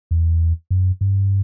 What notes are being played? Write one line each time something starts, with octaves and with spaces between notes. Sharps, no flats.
E2
F#2
G2